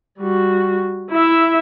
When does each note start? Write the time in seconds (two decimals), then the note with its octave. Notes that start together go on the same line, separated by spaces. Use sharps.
0.18 G3 F#4
1.11 E4 E5